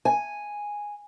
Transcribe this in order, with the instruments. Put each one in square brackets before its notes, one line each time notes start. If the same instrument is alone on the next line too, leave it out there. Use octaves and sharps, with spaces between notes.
[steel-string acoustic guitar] G#5